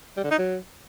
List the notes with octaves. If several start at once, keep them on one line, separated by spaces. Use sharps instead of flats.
G3
D3
D#4
F#3